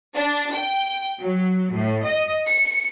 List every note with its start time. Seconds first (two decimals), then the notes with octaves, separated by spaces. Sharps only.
0.15 D4
0.54 G5
1.19 F#3
1.72 A2
2.04 D#5
2.47 C#7